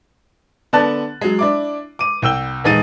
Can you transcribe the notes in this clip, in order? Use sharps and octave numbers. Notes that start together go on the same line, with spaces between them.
D3 B3 D5 A5 F#6 A6
F#3 G#3
D4 E4 D6
D6 D#7
C2 G5 E6 G7
D#1 E3 G#3 D#4 A6 D#7